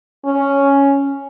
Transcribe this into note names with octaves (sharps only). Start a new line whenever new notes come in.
C#4